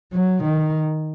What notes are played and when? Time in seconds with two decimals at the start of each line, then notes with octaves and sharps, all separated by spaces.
0.13 F#3
0.44 D#3